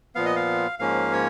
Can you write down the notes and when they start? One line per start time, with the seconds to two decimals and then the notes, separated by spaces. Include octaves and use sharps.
0.15 A#2 F3 B3 F5
0.26 D#5
0.36 F5
0.79 G#2 F3 A#3 C#4 F5
1.12 C#5